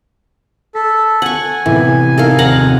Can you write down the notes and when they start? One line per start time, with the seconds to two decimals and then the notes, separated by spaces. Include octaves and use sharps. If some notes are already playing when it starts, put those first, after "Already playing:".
0.75 A4 B6
1.22 F#5 G#5 C#6
1.66 A2 C3 E3 B3
2.18 D#4 A4 A#4 F5
2.39 D#1 F2 C4 F#5 A#5 D6